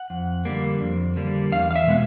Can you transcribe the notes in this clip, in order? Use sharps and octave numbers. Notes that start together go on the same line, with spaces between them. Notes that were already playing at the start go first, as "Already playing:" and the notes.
Already playing: F#5
F2
D3 G3 A#3
F2
D3 G3 A#3
E2 F5
F5
E5
B2 G#3 B3